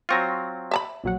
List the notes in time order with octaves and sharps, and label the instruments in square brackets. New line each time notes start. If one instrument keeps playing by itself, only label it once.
[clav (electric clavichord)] F#3 C4 F4 [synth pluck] C6 C#6 A#6
[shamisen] E5 A5 B5
[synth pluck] A#1 F#3 F#5